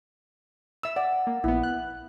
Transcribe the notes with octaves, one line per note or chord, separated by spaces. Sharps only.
E5 E6
D5 F#5
A#3
A#1 B3 E4
F#6